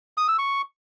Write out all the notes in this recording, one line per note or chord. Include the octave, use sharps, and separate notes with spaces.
D#6
E6
C#6